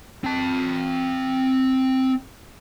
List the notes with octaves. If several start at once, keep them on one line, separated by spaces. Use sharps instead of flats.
C4 A5